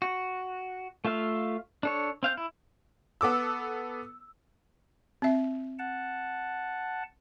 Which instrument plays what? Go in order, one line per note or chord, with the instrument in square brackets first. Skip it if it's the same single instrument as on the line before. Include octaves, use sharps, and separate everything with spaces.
[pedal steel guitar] F#4
A3 F4 E5 F5
D4 A4 C#5
C4 F5 G6
E4
[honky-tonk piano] B3 A4 D6 E6
[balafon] C4 E5
[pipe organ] F#5 A5